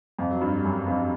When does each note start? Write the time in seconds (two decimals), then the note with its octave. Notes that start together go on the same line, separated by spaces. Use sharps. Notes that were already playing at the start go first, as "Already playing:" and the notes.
0.19 F2 F3
0.30 F#3
0.40 G2 G3
0.64 F#2 F#3
0.87 F2 F3